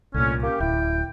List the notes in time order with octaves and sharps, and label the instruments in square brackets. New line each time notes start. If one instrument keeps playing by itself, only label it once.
[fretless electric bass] C2 A#2 [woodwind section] D3 A3 C#4
[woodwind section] A#3 C#4 G4
[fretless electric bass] D1 [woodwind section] E4 G5